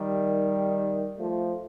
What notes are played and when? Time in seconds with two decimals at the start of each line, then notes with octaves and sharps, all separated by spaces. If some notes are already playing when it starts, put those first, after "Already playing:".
Already playing: D#3 G3
1.18 F3 A3